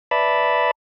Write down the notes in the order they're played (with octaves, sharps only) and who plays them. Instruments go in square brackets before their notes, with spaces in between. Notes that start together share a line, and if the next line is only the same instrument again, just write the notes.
[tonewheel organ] B4 D5 E5 A5 B5